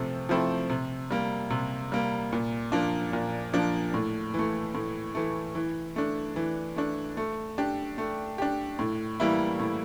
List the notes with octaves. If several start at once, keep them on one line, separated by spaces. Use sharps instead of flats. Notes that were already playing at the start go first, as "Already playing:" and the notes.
Already playing: C3 F3 A3 C4
F3 A3 C4 E4
C3
G3 A#3
C3
G3 A#3
A#2
F3 A#3 D4
A#2
F3 A#3 D4
A2
E3 A3
A2
E3 A3
E3
A3 D4
E3
A3 D4
A3
D4 G4
A3
D4 G4
A2
E3 G3 A#3 E4
A2